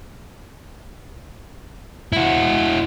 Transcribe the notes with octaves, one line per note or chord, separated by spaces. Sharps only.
E4 F#4